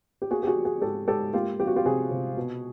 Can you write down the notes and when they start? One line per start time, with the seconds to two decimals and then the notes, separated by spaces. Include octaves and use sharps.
0.22 G4
0.30 A#3 F#4 G#4
0.43 G4
0.47 F#4 G#4
0.56 F3
0.65 F#4 G#4
0.81 G#2 G4 A4
1.08 G#2 G4 A4
1.33 A#3 F4 G4
1.60 F3 G4
1.67 F#4
1.76 F4 G4
1.85 C3 F#4 G#4
2.11 C3
2.37 B2